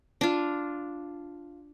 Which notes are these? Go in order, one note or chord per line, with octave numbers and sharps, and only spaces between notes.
D4 F4